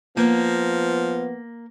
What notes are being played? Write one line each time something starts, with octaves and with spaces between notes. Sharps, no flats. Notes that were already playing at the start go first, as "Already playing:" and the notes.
F3 A#3 B3